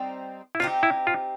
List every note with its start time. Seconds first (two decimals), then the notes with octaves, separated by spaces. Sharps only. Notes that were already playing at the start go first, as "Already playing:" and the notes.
Already playing: G3 C4 D#4
0.55 E4
0.60 C4 D#4 F4 G4
0.83 E4
1.07 F4